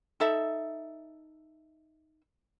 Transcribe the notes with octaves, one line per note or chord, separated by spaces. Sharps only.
D#4 A4 E5